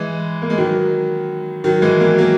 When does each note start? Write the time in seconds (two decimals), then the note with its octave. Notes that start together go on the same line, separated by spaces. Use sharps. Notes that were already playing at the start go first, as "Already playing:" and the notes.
Already playing: E3 G#3
0.42 A#3
0.50 G#3
0.57 D#3 F#3
1.64 D#3 F#3
1.82 E3 G#3
2.00 F#3 A#3
2.18 F#3 A#3